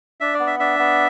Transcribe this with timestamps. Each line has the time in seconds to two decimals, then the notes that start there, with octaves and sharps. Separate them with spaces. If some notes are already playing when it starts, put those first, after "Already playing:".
0.21 D4 E5
0.34 D5
0.40 B3
0.47 E5
0.59 D4 E5
0.79 B3